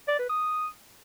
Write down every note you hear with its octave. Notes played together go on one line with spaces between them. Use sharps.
D5
B4
D#6